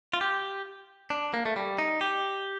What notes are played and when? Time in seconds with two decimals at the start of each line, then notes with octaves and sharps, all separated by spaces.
0.14 F4
0.21 G4
1.10 D4
1.34 A#3
1.46 A3
1.56 G3
1.78 D#4
2.01 G4